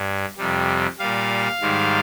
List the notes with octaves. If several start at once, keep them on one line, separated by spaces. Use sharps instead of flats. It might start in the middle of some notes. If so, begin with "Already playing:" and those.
Already playing: G2
F2 C3 G3
A#2 G3 F5
G#2 D#3 G3